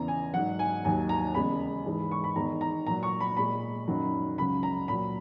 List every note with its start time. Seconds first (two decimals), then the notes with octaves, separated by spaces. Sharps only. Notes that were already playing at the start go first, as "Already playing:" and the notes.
Already playing: E2 C#3 E3 A#5
0.08 G#5
0.33 G#2 F#3 F#5
0.59 G#5
0.85 D#2 D#3 F#3 G#5
1.09 A#5
1.35 E2 C#3 G#3 B5
1.85 G#2 E3 G#3
2.11 C#6
2.24 B5
2.36 E2 D#3 G#3 A#5
2.61 A#5
2.86 A#2 F#3 A#5
3.03 C#6
3.20 B5
3.37 A#2 G#3 B5
3.87 F#2 D#3 F#3
4.38 C#2 C#3 F#3 B5
4.63 A#5
4.88 A#2 F#3 B5